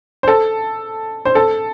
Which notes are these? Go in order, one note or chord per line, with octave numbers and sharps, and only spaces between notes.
C5
A4
C5
A4